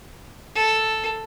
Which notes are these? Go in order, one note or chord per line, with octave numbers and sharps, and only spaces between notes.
A4